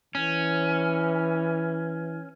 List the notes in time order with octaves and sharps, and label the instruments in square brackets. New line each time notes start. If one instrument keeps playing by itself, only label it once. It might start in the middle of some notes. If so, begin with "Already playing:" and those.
[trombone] E3 [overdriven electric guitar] C#4